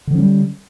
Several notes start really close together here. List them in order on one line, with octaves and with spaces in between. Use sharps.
D3 F3 C#4 G3